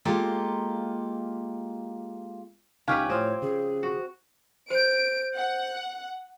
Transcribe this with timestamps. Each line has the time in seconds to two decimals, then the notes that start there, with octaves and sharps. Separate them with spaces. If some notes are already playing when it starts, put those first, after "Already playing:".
0.05 G#3 A#3 F4 G4 A4 A#5
2.88 C#2 C#3 C#4 D#4 G4 B4 F5
3.10 A2 F3 C4 C#5
3.42 C#3 G#4
3.83 F#4
4.70 C5 G6 D7
5.35 F#5